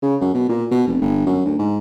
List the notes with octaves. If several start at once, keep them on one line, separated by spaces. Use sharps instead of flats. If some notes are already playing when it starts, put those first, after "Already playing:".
C#3
F#2
B2
A#2
B2
F1
G1
F#2
D2
G#2